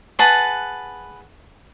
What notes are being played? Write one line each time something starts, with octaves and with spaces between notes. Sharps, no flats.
G#4 B4 F#5 A5